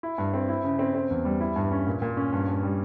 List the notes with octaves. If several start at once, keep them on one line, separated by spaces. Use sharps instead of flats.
E4
G2
C4
E4
C#3
C4
C4
E2
G3
E4
G2
C#4
A#2
A#2
C#4
G2
G2
G3